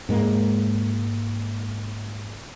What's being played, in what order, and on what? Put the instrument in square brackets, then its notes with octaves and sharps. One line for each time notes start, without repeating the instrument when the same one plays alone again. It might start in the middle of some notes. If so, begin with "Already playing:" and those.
[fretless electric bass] G#2 G#3 A#3